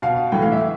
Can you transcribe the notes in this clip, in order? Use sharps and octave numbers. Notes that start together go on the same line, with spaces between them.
B2 F5
A2 E3 G5
F5
E5